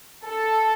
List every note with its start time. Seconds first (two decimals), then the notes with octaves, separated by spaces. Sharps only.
0.24 A4